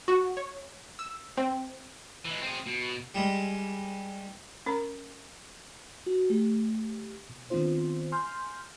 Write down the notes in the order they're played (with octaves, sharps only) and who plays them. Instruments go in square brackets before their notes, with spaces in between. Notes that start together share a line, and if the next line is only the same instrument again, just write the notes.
[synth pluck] F#4
C#5
E6
C4
[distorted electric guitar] E3 G#3
C4 G#4
B2
[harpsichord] G3 G#3
[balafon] C#4 A#4 A#5
[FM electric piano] F#4
A3 G4
B2
D#3 B3 C4 D4 F4 C5
G#5 C6 F6 G6